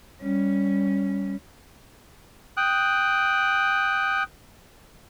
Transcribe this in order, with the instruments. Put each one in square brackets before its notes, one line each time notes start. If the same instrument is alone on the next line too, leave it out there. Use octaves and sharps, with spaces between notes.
[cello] G3 C#4
[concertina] G5 D#6 F#6